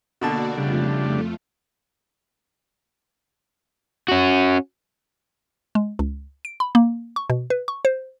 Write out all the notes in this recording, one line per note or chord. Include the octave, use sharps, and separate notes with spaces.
B2 D3 A#3 F#4 D5 A5
F2 C#3 G3 A3 D4 F4
C#4 F#4
G#3
C#2
D7
B5
A#3
C#6
B2
B4
C#6
C5